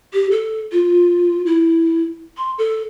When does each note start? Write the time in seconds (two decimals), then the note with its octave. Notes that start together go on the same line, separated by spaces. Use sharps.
0.14 G4
0.31 A4
0.72 F4
1.46 E4
2.38 C6
2.58 A4